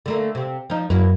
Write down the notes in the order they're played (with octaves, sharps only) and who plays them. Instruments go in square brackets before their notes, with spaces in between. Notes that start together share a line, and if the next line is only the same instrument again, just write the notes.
[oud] D3 A3 A#3
C3 C4
F3 D#4
[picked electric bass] F#2 [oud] A#3 E4 B4